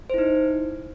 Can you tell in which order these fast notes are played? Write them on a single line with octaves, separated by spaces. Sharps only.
C5 E4 D#4